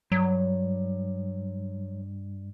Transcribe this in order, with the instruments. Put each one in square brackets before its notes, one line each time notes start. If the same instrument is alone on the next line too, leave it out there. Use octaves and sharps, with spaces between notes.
[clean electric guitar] G2 [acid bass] F#3